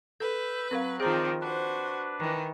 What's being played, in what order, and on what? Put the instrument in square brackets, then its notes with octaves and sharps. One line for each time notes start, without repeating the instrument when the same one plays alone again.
[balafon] A4 [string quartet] B4 [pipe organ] E6 G6
[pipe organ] F#3 F#6 [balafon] C4 A#4 F5
[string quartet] D#3 F3 C4 [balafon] G#4 A#5 [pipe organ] D5 D#5 G5
[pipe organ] D4 B4 [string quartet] F#4 C5
[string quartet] D#3 E3